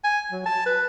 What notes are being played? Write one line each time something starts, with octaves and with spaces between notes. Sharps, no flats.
G#5
F#3
A5
B4